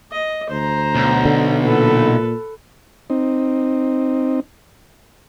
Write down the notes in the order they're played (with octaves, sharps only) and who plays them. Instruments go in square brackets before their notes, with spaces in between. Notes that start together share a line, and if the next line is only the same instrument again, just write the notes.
[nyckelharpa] D#5
[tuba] D2 [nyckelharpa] C5 A#5
[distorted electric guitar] B1
[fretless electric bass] D3
[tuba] A#2 [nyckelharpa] A4 B4
[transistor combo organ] C4 D#4